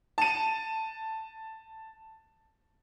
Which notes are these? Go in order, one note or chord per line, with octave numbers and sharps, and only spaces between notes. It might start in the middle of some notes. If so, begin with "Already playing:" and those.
A5 D#7